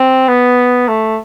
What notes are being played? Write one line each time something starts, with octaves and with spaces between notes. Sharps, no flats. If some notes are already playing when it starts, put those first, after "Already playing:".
Already playing: C4
B3
A3